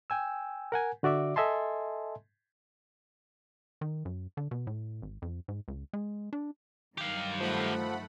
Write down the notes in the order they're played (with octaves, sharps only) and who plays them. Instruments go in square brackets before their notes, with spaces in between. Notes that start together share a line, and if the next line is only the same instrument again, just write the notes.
[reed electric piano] G5 G#5 E6
A#4 F#5 G#5
D3 F#4 D5 E5 D6
A4 D#5 E5 G#5 A5 C6
[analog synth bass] D#3
F#2
D3
B2
A2
G#1
F2
G#2
C#2
G#3
D4
[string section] G2 D#3 F#3 [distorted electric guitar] G4 F5
[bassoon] F3 [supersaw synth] A3 F#5 B5